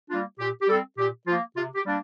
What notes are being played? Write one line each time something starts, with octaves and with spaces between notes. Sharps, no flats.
G3 A#3 D4 F4
A#2 G4
G4
G3 C4 A4
A#2 G4
F3 A#3 F4
C3 F4
G4
G3 A#3 D4